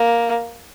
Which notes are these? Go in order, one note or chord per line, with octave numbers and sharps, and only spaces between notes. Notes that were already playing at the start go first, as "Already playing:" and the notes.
Already playing: A#3